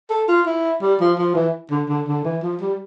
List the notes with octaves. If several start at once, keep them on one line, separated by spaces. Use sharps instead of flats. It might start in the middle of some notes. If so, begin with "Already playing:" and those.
A4
F4
E4
G3
F3
F3
E3
D3
D3
D3
E3
F3
G3